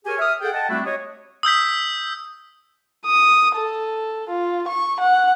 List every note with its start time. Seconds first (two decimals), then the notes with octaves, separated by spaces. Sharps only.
0.04 G4 G#4 A#4 C#5 G#5
0.19 E5 D#6 F6
0.41 G#4 A4 F#5 G5
0.53 D#5 F#5 G5 A5
0.70 G3 A3 C4 D4 E4 F#4
0.85 G4 C#5 D#5
1.43 D#6 E6 G6 B6
3.06 D#6
3.56 A4
4.29 F4
4.68 C#6
5.00 F#5